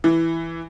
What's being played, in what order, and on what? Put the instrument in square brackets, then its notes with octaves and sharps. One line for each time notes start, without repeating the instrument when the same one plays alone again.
[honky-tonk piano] E3